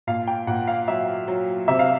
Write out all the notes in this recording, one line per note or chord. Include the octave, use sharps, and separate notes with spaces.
A#2 F5
G5
A#2 F#5
F5
F#3 E5
F#3
C3 E5
F5